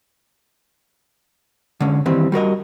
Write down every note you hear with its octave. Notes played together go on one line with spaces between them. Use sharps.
D3 G#3 C#4
D#3 E3 G3 C4
G3 F#4 A#4 D#5